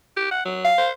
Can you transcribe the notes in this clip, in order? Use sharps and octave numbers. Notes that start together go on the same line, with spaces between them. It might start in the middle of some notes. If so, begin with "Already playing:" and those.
G4
F#5
F#3
F5
C5